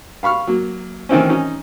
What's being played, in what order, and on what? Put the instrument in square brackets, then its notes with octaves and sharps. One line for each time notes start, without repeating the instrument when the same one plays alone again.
[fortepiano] F5 B5 C#6 F6
F#3 A#3
D#3 E3 C4 C#4
C#4 D#4